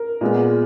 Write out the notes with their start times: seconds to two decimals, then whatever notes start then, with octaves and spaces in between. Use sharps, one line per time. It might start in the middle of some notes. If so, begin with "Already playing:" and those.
Already playing: A#4
0.21 A#2 G#3 B3